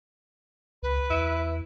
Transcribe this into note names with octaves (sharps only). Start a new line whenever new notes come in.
C#2 B4
E2 E4